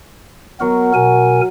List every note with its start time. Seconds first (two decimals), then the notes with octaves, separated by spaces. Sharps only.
0.60 F#3 B3 F#4 A#4
0.94 B2 A#4 G#5